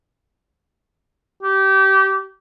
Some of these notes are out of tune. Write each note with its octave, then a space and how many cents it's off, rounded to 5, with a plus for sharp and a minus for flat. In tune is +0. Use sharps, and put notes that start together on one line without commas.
G4 -25